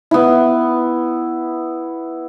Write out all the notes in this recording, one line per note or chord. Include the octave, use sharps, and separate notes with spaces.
B3 E4